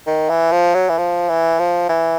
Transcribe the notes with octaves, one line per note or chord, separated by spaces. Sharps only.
D#3
E3
F3
F#3
E3
F3
E3
F3
E3